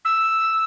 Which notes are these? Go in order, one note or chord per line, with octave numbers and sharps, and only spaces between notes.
E6